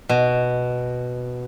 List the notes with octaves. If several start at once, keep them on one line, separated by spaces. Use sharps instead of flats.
B2